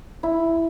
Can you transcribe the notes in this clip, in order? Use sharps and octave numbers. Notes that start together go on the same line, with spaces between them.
E4